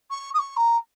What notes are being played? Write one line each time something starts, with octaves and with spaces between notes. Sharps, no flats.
C#6
D#6
C#6
A#5